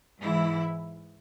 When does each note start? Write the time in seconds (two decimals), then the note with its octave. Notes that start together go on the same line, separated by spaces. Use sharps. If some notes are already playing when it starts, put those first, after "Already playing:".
0.20 G#2 E3 E4